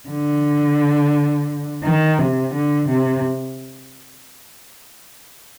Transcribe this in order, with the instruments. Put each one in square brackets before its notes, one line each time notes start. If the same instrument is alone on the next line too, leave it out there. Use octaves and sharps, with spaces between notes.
[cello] D3
D#3
C3
D3
C3